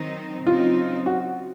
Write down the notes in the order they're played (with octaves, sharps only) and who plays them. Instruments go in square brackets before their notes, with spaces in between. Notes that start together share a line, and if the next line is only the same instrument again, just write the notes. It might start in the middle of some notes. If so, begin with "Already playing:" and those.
Already playing: [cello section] D#3 F#3 C4 D#4
[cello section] C#3 F#3 C4 D#4 [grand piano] F4
[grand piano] F#4